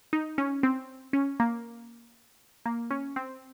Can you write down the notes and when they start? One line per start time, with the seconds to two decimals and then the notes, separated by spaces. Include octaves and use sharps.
0.13 D#4
0.38 C#4
0.63 C4
1.13 C#4
1.40 A#3
2.66 A#3
2.91 C#4
3.16 C4